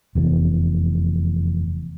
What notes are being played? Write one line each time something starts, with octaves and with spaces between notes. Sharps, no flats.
F1 E2